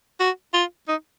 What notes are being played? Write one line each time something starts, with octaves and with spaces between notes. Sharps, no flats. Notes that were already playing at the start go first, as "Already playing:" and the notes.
F#4
F4
D#4